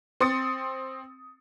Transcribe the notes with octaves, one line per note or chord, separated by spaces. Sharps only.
C4 C6 D#6 A6 C#7